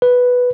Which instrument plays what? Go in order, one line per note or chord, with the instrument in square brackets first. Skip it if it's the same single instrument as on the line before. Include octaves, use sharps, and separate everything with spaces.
[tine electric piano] B4